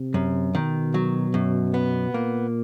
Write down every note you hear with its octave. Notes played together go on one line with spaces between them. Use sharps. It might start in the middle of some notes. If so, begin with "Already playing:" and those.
Already playing: C3
F#2
B2 D#3
F#3
F#2
B3
A#2 A#3